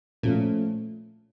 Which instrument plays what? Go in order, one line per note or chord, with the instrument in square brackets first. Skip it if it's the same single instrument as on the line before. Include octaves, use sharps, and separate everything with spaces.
[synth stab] A#2 [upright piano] F3 A3 C#4